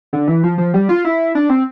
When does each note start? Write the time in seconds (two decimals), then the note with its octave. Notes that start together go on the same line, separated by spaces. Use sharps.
0.13 D3
0.28 E3
0.43 F3
0.58 F3
0.74 G3
0.89 F4
1.05 E4
1.35 D4
1.49 C4